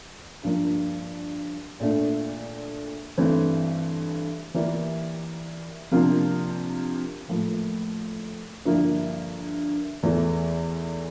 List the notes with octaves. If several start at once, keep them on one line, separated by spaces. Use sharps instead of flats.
G2 F3 A#3 D4
A#2 A3 D4
G2 E3 A3 C4
E3 A#3 E4 G4 D5
C3 F3 A#3 D4 F4
A2 F3 A#3
G2 D3 F3 A#3 E4
E2 E3 A3 E4